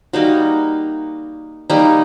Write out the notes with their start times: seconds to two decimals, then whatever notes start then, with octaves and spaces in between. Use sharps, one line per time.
0.13 G3 A#3 D#4 F#4
1.70 G3 A#3 D#4